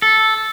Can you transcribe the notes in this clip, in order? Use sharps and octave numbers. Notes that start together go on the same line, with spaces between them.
A4